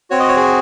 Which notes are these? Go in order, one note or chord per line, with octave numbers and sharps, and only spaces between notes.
C4 F#4 C#5
D#5
C#5
G#4